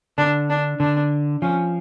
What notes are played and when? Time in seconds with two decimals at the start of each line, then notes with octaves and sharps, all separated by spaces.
0.18 D3 D4
0.50 D4
0.80 D3 D4
1.42 F3 C#4